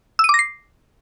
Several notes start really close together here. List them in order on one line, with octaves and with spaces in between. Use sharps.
E6 D#7 D6 A#6 C7